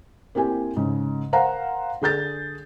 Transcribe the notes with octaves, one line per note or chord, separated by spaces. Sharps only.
A#3 C4 E4 G4 G#5
G#2 C#3
A#4 C5 F5 F#5 A#5
D3 G#4 G6 A6